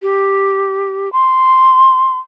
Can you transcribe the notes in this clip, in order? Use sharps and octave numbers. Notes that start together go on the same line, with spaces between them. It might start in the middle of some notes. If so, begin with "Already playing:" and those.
G4
C6